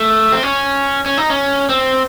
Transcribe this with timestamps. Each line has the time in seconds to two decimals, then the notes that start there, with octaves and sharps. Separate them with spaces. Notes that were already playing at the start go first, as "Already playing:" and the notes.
Already playing: A3
0.32 C4
0.43 C#4
1.06 C#4
1.18 D#4
1.30 C#4
1.69 C4